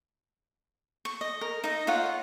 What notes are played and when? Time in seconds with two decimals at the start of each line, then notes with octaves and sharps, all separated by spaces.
1.05 C#6
1.21 D#5
1.41 A#4
1.64 D#4 D#5
1.87 F4 C#5 F5 F#5